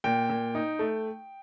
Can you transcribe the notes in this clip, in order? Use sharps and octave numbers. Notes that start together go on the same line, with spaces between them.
A#2 G5
A#2
D#4
A3